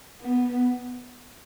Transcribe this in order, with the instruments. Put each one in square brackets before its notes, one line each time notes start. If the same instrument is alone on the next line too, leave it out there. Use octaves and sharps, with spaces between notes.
[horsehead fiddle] B3